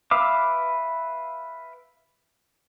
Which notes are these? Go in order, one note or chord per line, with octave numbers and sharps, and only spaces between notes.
B4 E5 F5 D6